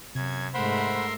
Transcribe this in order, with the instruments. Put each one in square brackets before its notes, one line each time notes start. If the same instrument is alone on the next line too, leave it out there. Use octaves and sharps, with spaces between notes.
[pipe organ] F#2 G#6 [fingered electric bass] C3
[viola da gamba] G#2 A3 [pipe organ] A#4 E5 C6 [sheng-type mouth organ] C5 F#5 B5